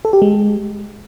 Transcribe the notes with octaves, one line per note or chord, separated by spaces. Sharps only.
A4
G4
G#3